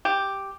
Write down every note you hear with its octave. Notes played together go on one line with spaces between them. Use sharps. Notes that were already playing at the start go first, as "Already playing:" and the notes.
G4